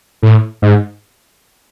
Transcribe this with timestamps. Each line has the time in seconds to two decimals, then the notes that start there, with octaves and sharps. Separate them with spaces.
0.23 A2
0.62 G#2